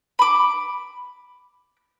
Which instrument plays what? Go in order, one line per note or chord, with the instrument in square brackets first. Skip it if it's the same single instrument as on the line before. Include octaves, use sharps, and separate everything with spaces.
[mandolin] B5 D6